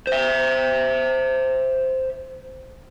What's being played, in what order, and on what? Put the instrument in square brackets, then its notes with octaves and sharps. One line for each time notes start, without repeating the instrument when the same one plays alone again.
[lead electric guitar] C5 E5